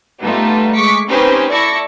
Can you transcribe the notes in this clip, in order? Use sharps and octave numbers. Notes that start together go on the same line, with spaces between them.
G3 A3 B3 D#4 F4 A4
G#3 C#6 D6 B6 C#7
C4 C#4 D#4 G4 B4 C5
E4 A4 D5 C#6 A#6 C#7